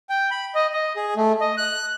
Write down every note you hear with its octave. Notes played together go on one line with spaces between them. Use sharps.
G5
B5
D#5
D#5
G#4
A3
D#5
F#6